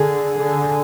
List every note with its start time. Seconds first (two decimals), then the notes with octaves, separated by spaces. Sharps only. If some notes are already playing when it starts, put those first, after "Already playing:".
Already playing: D3 G#4
0.41 D3